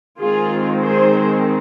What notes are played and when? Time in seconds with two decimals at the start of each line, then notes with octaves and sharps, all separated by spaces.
0.20 D#3 G#3 C4 F4 G#4
0.83 G#4 C5